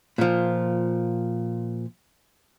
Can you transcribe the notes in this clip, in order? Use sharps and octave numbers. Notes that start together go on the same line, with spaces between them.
A#2 F3